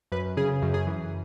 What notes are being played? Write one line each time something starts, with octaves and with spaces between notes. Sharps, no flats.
F#2 B4
C#3 G#4
F#2
G#4
E3